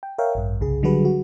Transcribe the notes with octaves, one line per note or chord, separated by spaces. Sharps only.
G5
A#4 C#5 E5 F5 G5
A1 G2
C2 C#3 G#4
D3 F#3 G3 F#4 G#4 B4
F#4